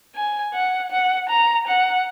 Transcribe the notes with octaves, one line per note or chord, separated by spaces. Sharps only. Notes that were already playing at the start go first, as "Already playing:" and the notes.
G#5
F#5
F#5
A#5
F#5